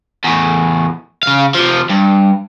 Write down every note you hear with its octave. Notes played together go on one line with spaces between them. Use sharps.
E2 A2
C#3 F5
C3 F3
G2